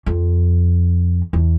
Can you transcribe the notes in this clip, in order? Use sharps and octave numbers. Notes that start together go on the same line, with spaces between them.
F2
E2